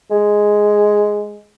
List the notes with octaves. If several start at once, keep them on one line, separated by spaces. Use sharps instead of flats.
G#3